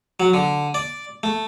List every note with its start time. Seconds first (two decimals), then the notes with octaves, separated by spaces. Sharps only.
0.20 F#3
0.34 D3
0.74 D5
1.23 A3